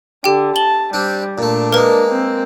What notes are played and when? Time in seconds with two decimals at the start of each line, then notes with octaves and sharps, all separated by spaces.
0.24 D3 G4 G5
0.56 A5 F#7 G7
0.93 G3 C4 D4
1.38 A#2 A3 D4
1.73 G#3 A#3 A#4 B4
2.10 C4